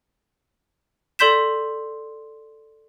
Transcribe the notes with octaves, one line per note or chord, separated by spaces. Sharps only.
A4 D5 C6 G6 B6 E7